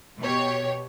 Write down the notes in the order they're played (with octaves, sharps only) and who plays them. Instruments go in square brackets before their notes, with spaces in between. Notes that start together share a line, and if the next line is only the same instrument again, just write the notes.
[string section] B2 G4 C#5